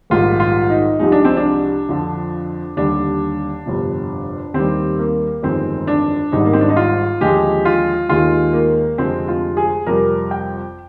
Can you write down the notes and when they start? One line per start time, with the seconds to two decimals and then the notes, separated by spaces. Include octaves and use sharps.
0.10 A#1 G#2 D#3 G3 F4
0.40 F4
0.70 D#4
0.99 C2 C3 F3 G#3 D#4
1.12 D4
1.25 C4
1.37 D4
1.89 F2 D3 F3
2.76 D#2 D3 G3 D4
3.66 G1 F2 C3
4.54 D#2 D#3 G3 C4
4.99 A#3
5.43 G1 F2 D#3 G#3 C4
5.87 D4
6.32 G#1 G#2 G3 D#4
6.45 A#3
6.53 C4
6.61 D4
6.69 D#4
6.76 F4
7.21 D#2 D3 F3 G#3 G4
7.65 F4
8.09 D#2 D#3 G#3 F4
8.53 A#3
8.98 F1 F2 D3 G#3 C4
9.28 F4
9.57 G#4
9.87 F2 C3 G3 A#4
10.31 G5